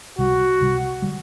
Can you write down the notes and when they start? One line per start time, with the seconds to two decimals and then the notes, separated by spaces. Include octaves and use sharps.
0.18 C2 C3 G3 F#4
0.60 C2 C3 G3
1.02 D3 G3